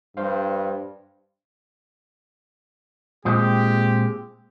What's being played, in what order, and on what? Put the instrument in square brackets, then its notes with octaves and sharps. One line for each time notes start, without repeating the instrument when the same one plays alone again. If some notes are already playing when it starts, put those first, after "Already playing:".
[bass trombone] G2 [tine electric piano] C5 F5
[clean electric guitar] A#2 G#3 C4 [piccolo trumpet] G4